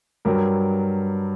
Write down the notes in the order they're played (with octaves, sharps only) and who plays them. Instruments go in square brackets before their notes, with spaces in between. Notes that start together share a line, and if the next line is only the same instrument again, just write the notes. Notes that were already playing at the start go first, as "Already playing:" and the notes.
[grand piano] G2 F#3 A#4